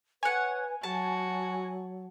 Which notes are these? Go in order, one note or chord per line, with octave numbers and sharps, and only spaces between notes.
B4 C#5 F#5 G#5
F#3 F#4 A5